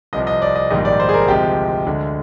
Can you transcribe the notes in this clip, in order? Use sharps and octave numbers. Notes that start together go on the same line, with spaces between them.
C2 C3 F3 D#5
D#5
D5
D#5
A#1 G#2 D#3 G3 D#5
D5
C5
G#4
A#4
D2 C3 F3 G#3 G4
D2 D3 G#3